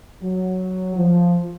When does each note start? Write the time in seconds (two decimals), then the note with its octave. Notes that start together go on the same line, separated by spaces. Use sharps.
0.22 F#3
0.96 F3